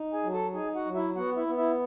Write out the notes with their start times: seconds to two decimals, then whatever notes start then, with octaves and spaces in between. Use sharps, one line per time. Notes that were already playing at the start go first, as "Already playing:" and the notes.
Already playing: D#4
0.13 G#4 G#5
0.23 F#3
0.33 A4 A5
0.53 D#4 G#4 G#5
0.75 F#4 F#5
0.85 F#3
0.95 E4 E5
1.16 B3 F#4 F#5
1.36 E4 E5
1.47 B3
1.57 E4 E5